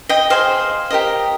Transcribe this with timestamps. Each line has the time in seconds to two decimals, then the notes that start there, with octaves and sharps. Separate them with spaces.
0.09 D#5 G5
0.30 G#4 C5 D#5 F5
0.90 G4 A#4 D#5